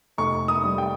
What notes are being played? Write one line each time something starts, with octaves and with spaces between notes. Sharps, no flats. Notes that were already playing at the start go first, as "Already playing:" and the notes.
F1 C#6
D#6
G3
G5